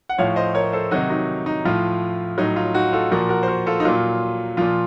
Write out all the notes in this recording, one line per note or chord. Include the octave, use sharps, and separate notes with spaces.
F#5
A2 F3 C#5 F5
C5 D#5
A#4 C#5
A4 C5
C3 D#3 F#3 D#4 F#4
D#4 F#4
D#4
A2 F3 F4
A2 F#3 D#4
F4
D#4 F#4
F4 A4
A#2 F3 F#4 A#4
F#4 A#4
C5
F#4 A#4
F4 A4
D#4
A#2 F#3 F4
A#2 F3 F4